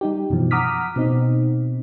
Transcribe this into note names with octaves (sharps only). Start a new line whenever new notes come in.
G3 D#4 G4
F#2 B2 E3 F3
F#5 A#5 D6 D#6 F6 B6
B2 C4 D#4